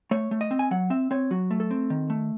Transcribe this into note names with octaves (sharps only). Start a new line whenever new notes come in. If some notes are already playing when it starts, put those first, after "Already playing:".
A3 C#5
A3
D#5
C4
G#5
F#3 F#5
C4 E5
C4 C#5
F#3 F#4
A3
A4
C4
D#3
A3